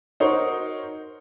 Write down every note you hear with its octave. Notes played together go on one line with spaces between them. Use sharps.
D#4 F#4 A#4 C5 C#5